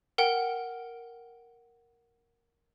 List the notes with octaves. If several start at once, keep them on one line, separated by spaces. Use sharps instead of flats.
A#4 F#5 G5 G7